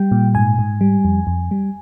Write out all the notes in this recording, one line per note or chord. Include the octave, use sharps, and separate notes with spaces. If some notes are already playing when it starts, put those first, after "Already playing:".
Already playing: G3 G5
A#2
G#2 G#5
G#2
G3
F2
F2
G3